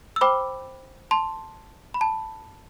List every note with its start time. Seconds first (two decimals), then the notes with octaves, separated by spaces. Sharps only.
0.16 E6
0.21 C5 G5 B5 D6
1.11 A5 C6
1.94 B5
2.01 A5